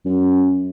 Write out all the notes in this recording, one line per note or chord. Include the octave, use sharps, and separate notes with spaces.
F#2